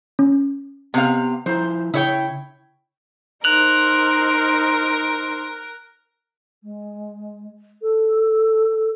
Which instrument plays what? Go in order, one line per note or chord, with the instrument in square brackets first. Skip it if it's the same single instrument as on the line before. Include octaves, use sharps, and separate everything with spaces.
[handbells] C#4
[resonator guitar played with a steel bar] C3 F5 [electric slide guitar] B3
[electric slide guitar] F3 E4 A#5 [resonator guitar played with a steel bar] C5
[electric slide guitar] C#3 [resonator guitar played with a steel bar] E4 C#5 G5
[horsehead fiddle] D#4 C5 [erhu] A#4 [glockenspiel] F#6 F7 F#7
[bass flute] G#3
A4